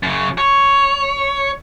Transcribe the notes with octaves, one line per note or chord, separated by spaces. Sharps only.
F#2 C#3
C#5